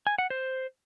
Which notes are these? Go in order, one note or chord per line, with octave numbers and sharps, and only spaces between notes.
G#5
F#5
C5